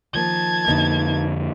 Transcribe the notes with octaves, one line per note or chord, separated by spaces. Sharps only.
D#3 F3 A#3 A5 G#6
F2 D3 A#3 B3 D#4